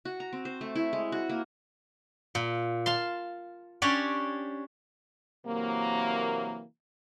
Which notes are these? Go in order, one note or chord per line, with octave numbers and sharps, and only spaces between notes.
F#4
A#5
C4
C5
A3
E4
G#3
F#4
A#3
A#2
F5 A5 C6
C#4 D4 G4 C#5 D5
C3 E3 F#3 A#3